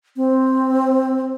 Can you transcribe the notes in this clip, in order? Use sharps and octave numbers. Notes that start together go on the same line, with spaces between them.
C4